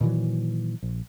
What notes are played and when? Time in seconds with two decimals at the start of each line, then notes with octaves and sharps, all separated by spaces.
0.01 A#2 D#3 E3 F#3
0.83 A#1